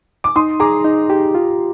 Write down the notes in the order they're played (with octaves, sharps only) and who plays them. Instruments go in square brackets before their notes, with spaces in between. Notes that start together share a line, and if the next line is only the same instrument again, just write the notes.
[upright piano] D6
[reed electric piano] D#4 [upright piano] C6 D#6
[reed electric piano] G#4 [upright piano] A#5 D6
[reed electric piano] D#4
G4
F4